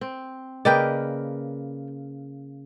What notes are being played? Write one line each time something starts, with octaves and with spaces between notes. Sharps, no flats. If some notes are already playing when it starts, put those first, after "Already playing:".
C4
C#3 A#3 B4 D5 D#5 G5